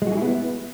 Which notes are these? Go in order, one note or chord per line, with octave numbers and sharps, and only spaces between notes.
G#3
F#4
G#4
E4
B3